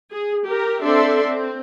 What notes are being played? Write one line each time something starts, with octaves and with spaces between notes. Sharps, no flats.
G#4
G4 A#4
C4 D4 A4 D5 E5 C6
C4